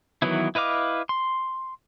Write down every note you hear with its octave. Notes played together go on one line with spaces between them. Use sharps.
D#3 E3 F#3 B3 E4
E4 B4 D#5 F5 D6
C6